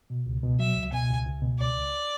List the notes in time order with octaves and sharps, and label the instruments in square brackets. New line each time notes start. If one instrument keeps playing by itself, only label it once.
[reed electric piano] B2
C#2
B2
[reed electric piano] F#3 [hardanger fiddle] E5
[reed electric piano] C#2
[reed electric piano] B2 [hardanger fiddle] G#5
[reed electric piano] C#2
C#2
B2
[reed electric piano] C#2 [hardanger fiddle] D5
[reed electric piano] C#2